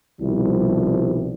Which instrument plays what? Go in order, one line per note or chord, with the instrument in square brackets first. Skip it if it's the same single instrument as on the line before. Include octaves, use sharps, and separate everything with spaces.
[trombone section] C2 B2 D#3 F3 G3 E4